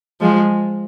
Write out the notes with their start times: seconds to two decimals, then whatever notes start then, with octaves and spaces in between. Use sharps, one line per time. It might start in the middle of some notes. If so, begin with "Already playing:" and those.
0.21 F3 G#3